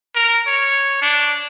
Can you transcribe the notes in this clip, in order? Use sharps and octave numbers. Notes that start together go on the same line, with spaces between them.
A#4
C#5
D4